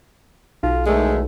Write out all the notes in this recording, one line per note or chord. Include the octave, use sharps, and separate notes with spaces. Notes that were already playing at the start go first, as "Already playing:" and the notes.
B1 F4
E2 D#3 G#3 A3